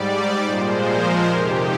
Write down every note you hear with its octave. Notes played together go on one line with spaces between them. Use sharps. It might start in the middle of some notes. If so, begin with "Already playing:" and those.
Already playing: G#2 G3 D5
A#2 F3 G#3 C5
A#4
F2 C3 D#3 G4